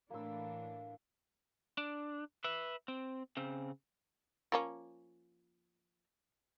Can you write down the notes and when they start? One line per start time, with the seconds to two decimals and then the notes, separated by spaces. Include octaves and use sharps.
0.10 A2 E3 A#3 D4 E6
1.78 D4
2.44 B4 E5
2.88 C4
3.37 C#3 C4
4.52 F3 A#3 C#4